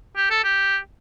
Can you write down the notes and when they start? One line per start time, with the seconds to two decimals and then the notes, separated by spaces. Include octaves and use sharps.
0.16 G4
0.30 A4
0.44 G4